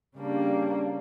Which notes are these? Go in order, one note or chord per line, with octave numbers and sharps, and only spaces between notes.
C#3 G3 A#3 D4